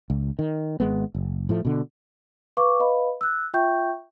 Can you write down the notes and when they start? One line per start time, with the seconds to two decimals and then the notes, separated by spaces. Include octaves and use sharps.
0.10 C#2
0.39 D#3
0.80 G#1 G#3 B3
1.15 F#1
1.49 A2 F3 A3
1.65 B2 D3
2.57 B4 F5 C#6 D6
2.80 B4 D#5 F5 B5
3.21 E6 F#6
3.54 F4 E5 G5 C#6 G6